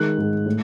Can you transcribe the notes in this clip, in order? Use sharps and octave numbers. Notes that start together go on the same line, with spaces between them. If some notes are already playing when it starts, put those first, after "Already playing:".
Already playing: D#3 G#3 F#6
G#2 D#3 G#3
A2